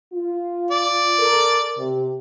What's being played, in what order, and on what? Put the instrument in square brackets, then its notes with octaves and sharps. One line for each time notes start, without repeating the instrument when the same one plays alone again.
[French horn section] F4
[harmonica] D5
[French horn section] A4 A#4
C3